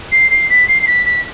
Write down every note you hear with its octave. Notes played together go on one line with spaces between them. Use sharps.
C7
C7
B6
C7
C7
B6
B6